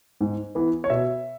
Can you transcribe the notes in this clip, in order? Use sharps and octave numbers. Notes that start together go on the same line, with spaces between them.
G#2
E3 B3
C#5
B2 E5